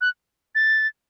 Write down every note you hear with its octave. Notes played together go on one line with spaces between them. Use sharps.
F#6
A6